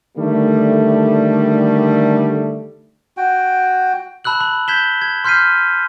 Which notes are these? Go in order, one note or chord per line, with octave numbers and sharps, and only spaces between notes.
D3 D#3 G3 A3
F#4 G5
A5 B5 E6 F#6 F#7
B5 F#6
G6 G#6 B6 E7 G7
G#6
C6 F6 G6 B6 C7 D#7